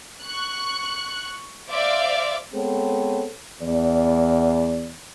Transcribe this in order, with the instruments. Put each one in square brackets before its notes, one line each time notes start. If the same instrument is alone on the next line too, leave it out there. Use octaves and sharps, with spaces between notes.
[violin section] C#6 F#6
C5 D5 E5 F5 D6
[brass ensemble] G#3 B3 C4 G#4 A4 C#5
E2 D5